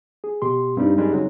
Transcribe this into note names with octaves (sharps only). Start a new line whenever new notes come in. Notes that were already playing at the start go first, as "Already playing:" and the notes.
G#4
B2 G4 C6
G2 G3 C4 D#4
F#2 G3 G#3
C#3 F#3